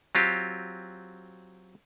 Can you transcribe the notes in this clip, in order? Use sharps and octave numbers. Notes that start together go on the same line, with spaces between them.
F#3 C4 F4 G4